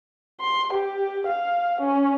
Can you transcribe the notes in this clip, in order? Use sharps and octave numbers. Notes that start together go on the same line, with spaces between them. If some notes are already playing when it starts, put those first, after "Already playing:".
C6
G4
F5
C#4